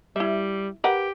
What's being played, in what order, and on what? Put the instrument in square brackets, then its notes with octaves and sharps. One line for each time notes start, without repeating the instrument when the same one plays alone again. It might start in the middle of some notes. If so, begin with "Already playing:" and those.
[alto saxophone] G3 [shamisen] E4 E5
[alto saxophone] G4 [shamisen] A#4 B4 F#5